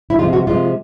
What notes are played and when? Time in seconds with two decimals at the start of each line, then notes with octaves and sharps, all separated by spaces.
0.10 E4
0.18 C3 F3 G#3 F4
0.33 F#4
0.47 C3 F3 G#3 F4